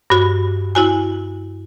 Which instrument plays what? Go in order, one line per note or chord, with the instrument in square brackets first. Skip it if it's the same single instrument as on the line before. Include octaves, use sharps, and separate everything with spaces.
[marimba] G2 F#4
E4 F#4 G#5